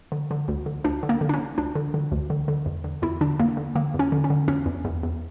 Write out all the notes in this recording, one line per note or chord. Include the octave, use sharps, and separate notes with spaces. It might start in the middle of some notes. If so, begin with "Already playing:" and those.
D3
D3
D2
D3
D2 D4
D3
A#3
D3
D4
C#4
D3
D2 D4
D3
D3
D2
D3
D3
E2
D3
E2 E4
D3 D4
E2 A#3
D3
D3 A#3
E2
C#4
D3
C#4
D3
E2 C#4
E2
E2
E2